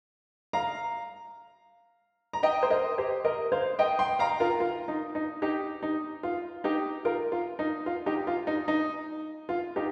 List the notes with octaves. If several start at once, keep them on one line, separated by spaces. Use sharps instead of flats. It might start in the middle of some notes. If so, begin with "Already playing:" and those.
F5 A#5
A#5
D#5 G5
C5
A#4 D#5
G4 C5
A#4 D#5
C5 F5
D#5 G5
G5 C6
F5 A#5
F4 A#4
F4
D#4
D#4
D#4 G4
D#4
F4
D#4 G4
F4 A#4
F4
D#4
F4
D#4 G4
F4
D#4
D#4
F4
D#4 G4